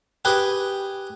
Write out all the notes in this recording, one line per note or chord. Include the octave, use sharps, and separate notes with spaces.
G4 G#4 B4